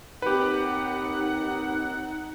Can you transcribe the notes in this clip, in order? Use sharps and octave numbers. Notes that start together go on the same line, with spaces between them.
D#2 C4 D#4 G4 B4 F#5